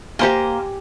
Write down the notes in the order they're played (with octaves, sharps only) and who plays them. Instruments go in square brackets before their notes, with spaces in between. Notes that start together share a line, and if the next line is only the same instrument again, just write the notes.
[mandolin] A#3 C5 [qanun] G4 G#5